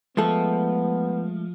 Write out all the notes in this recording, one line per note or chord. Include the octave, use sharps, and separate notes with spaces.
F3 G#3 A3 B3 A4